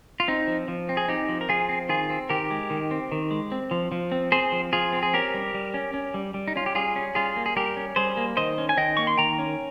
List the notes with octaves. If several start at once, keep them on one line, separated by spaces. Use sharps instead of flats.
F4
C4 D#4
F3
F3
C4
G#4
C4 D#4 G4
F3
A#4
F3 F4 G#4
C4
D#3 F4 G#4
C4
D#3 G4 A#4
G#3
D#3
C4
D#3
G#3
C4
F3
F3
C4
C4 G#4 C5
F3
F3 F4 G#4
C4
G#4
C#4 G4 A#4
G3
G3
C#4
C#4
G3
G3
D#4
C#4 F4
G4
G3 F4 G#4
C#4
G3 F4 G#4
A#3
G#4
G3 G4 A#4
C#4
G3 G#4 C5
A#3
D#3 C5 D#5
C#4
G#5
D#3 D#5 G5
A#3 C#6
C6
D#3 G5 A#5
C#4